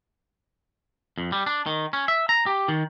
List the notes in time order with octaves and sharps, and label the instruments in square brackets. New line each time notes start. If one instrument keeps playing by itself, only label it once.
[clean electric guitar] F2
G3
D4
D#3
C#4
E5
A#5
G4
D#3